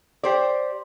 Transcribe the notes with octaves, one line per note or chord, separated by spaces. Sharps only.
G4 C5 D5